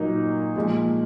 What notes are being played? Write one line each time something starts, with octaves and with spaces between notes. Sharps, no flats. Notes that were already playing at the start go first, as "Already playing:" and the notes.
Already playing: A#2 F#3 A#3 D#4
A#2 F3 G#3